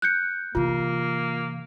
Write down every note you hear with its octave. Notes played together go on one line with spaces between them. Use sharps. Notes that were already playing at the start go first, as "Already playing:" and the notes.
F#6 G6 C#7
C3 E3 A#3 F4